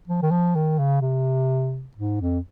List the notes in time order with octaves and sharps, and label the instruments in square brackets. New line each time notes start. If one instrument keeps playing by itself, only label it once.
[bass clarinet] F3
D#3
F3
D#3
C#3
C3
G#2
F2